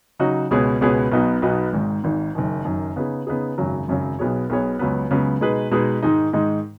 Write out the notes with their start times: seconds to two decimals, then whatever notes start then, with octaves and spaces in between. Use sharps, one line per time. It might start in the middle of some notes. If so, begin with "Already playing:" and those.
0.20 C#3 F#3 D#4 F#4
0.51 C#2 B2 B3 G#4 C#5
0.81 C#2 B2 B3 G#4 C#5
1.12 B1 B2 B3 D#4 F#4
1.42 B1 B2 B3 D#4 F#4
1.73 G#1 G#2 D#3
2.04 G#1 G#2 D#3
2.35 F#1 F#2 D#3
2.65 F#1 F#2 D#3
2.96 C#3 B3 D#4 G#4
3.27 C#3 B3 D#4 G#4
3.58 G#1 F#2 C#3 F#3
3.88 G#1 F#2 C#3 F#3
4.19 B1 B2 B3 G#4 C#5
4.50 B1 B2 B3 G#4 C#5
4.79 C#2 C#3 F#3 B3
5.11 C#2 C#3 F#3 B3
5.41 B2 G#3 D#4 G#4 B4
5.71 B2 G#3 D#4 G#4 B4
6.03 G#2 D#3 G#3 D#4
6.33 G#2 D#3 G#3 D#4